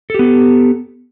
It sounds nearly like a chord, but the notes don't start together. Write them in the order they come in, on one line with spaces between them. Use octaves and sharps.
A4 G4 B3